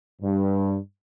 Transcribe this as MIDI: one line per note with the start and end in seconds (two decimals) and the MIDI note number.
0.22 0.76 43